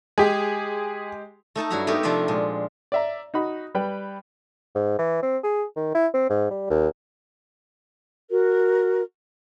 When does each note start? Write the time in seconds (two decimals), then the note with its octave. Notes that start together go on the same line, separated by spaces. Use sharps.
0.18 G#3 G4 G#4
1.56 A3 D#4 A4 A5
1.70 G2 F#3 E4 F#4 E5 A#5
1.87 A3 B3 D#4 G4 A4 A#4
2.03 C3 F3 D4 F4 D5 E5
2.28 A#2 G#3
2.92 D5 E5 A#5
3.34 D#4 F#4 B5
3.75 G3 B4 G5
4.75 G#2
4.99 E3
5.22 C4
5.44 G#4
5.76 D#3
5.95 E4
6.14 C4
6.30 G#2
6.51 G3
6.70 D#2
8.30 F#4 A#4